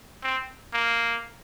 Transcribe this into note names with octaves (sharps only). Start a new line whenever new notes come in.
C4
A#3